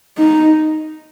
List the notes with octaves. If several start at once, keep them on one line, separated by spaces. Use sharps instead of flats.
D#4